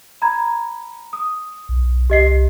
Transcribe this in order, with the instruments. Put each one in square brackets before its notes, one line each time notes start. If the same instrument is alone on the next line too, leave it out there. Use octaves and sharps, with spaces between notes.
[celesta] A#5 B5 G#6
D#6
[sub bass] B1
[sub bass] C2 [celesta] G4 D#5 C7